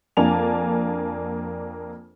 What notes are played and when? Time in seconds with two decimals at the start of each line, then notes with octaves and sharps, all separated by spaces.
0.17 F2 A#3 D4 G#5 A5 F7